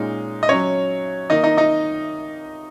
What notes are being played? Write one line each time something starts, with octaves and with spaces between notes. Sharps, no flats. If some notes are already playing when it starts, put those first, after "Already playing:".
Already playing: A#2 G#3 C#4 D#4
D#5
F#3 C#4 C#5
D#3 A#3 D#4 D#5
D#4 D#5
D#4 D#5